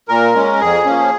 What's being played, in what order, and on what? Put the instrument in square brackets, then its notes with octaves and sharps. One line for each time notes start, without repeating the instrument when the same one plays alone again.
[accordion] A#2 A#4
G#3 C#4
F2 G#4
F3 A#3 C#4